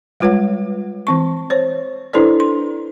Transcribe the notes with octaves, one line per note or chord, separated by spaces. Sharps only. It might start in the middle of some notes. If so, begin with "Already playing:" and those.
G3 G#3 F4 B4 C#5 F#5
E3 C4 C#6
C5 C#5
D4 E4 A4 B4 C5 D5
C6